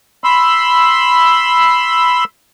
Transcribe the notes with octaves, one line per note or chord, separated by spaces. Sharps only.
B5 C6 E6